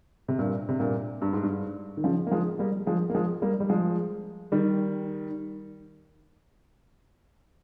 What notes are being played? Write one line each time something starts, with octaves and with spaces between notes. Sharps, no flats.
C3
G2 A#2
C3
G2 A#2
G2
G#2
G2
D#3
C#3 F3
A#3
F3 G#3
G3 A#3
F3 G#3
A#3
F3 G#3
G3 A#3
G3
F3 G#3
D#3 G3